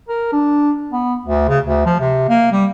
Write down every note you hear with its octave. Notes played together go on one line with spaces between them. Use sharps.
A#4
D4
B3
D2
C#3
D2
F3
C3
A#3
G3